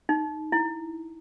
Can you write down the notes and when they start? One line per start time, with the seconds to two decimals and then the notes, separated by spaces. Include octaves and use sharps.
0.09 D#4
0.52 E4